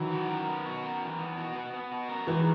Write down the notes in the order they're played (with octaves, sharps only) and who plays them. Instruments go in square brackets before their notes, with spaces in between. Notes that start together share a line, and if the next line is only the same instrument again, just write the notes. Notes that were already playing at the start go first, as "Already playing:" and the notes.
Already playing: [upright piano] D#3 F#3 [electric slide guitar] E3
[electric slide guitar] F#4
A#4
B3
F#4
A#4
E3
B3
F#4
B3
B3
F#4
A#4
[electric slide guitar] D#3 [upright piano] E3 G#3